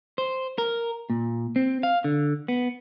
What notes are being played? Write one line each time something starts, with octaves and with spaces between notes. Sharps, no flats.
C5
A#4
A#2
C4
F5
D3
B3